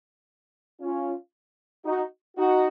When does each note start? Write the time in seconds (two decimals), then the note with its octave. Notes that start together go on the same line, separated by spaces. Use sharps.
0.81 C#4 F4
1.85 D#4 F#4
2.37 D#4 F#4